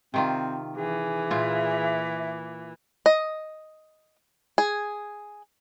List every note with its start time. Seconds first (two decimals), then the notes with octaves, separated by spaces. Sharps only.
0.14 C3 D#3 C4 F4
0.77 E3 G#4
1.31 A#2 F4 E5
3.06 D#5
4.58 G#4